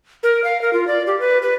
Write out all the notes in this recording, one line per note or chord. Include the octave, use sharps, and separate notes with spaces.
A#4
F5
A#4
F4
D5
G4
B4
B4